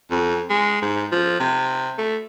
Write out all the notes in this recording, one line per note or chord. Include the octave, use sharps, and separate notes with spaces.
F2
G#3
G#2
F3
C3
A3